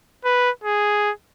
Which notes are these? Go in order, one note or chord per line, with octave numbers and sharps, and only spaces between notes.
B4
G#4